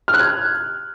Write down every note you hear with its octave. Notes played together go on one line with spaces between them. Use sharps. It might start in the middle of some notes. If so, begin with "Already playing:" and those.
F6
F#6
G#6